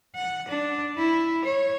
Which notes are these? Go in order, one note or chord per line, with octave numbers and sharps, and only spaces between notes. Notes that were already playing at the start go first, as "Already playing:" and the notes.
F#5
D4
E4
C#5